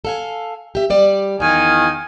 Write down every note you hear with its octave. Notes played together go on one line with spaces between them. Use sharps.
A4 F5 G#5
G4 E5
G3 D5
E2 D#3 F5 G#5